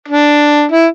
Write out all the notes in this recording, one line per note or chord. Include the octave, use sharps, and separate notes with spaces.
D4
E4